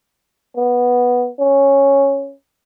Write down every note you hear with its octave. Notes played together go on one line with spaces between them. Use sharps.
B3
C#4